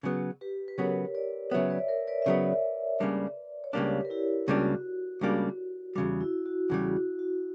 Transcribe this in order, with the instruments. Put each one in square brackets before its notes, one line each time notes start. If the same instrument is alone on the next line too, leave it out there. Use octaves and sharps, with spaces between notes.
[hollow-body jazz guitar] C#3 F#3 B3
[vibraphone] G4 B4
B4
[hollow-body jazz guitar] C#3 F#3 B3 [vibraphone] A#4 C#5
[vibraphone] B4 D5
[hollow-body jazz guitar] C#3 F#3 B3 [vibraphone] C#5 E5
[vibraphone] B4 D5
A#4 C#5
B4 D5
E5
[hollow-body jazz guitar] C#3 F#3 B3 [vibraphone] B4 D5
[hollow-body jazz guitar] C#2 C#3 G3 A#3 D4
[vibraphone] C#5
[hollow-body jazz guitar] C#2 C#3 G3 A#3 D4 [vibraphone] G4 B4
[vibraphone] A#4
E4 G4
[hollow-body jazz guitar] C#2 C#3 G3 A#3 D4 [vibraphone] F#4
[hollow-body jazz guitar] C#2 C#3 G3 A#3 D4
[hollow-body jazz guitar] E2 C#3 G3 [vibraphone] F#4
[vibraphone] E4
F#4
[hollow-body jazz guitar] E2 C#3 G3 [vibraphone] F#4
[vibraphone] F#4